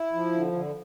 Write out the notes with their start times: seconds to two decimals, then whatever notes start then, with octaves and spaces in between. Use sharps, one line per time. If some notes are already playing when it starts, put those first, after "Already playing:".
Already playing: E4
0.13 F3
0.33 D3
0.52 D3